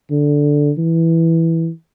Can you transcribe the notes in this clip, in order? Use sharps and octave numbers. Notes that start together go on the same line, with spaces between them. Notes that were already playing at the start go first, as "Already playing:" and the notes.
D3
E3